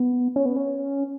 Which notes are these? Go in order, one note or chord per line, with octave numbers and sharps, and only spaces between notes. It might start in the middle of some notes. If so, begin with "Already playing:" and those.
Already playing: B3
C#4
B3
C#4